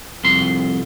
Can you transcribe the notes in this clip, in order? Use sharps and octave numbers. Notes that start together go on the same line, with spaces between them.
C2 F2 C6